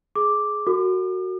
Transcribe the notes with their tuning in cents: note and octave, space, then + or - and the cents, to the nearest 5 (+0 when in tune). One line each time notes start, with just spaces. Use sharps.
G#4 +20 D6 +0
F#4 +0 A#4 -45 D6 +40